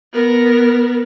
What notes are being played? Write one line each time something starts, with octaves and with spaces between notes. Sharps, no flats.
B3 A#4